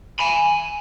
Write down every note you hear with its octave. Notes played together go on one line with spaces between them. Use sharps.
G#5 B5